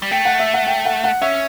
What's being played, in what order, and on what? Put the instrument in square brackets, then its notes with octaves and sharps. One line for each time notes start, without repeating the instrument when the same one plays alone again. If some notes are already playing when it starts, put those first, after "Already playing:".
[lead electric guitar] G3
[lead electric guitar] A3 [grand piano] G5
[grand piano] F#5
E5
F#5
G5
F#5
F#5
[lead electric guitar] C#4 [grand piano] E5